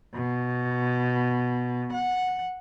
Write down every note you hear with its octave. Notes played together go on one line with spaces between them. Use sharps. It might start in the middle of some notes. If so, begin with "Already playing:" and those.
B2
F#5